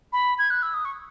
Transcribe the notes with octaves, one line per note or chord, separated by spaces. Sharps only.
B5
G#6
F#6
E6
D#6
C#6